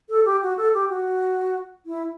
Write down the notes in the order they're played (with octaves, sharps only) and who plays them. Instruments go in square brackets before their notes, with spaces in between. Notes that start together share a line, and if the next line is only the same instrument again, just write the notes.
[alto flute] A4
G4
F#4
A4
G4
F#4
E4